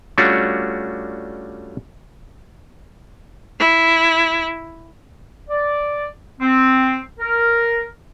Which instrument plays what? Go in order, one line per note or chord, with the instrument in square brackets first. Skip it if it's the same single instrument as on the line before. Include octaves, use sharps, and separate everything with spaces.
[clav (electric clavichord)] G3 A3 C#4 D4 F4 F#4
[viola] E4
[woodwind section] D5
C4
A#4